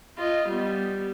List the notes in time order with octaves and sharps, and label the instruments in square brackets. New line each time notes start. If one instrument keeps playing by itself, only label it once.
[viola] F4 D#5
G3 B3